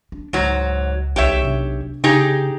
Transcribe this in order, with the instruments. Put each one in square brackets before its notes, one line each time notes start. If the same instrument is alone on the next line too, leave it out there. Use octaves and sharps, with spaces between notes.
[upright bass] D4
[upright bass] C#2 [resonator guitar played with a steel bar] G#2 F#3
[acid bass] B1 [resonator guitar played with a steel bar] G4 C#5 E5
[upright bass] C3 D4
[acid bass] C#3 [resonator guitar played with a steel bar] D#4 G4 G#4